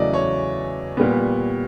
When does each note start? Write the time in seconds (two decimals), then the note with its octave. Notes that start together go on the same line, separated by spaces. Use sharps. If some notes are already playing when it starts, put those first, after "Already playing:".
Already playing: E2 C#3 F#3 A3 D5 D#5
0.14 C#5
0.97 A#2 G3 B3